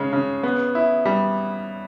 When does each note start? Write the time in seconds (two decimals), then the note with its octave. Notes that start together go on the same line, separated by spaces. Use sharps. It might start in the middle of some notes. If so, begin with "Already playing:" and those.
Already playing: C#3 G#3
0.13 C#3
0.43 B3
0.75 E4
1.05 G3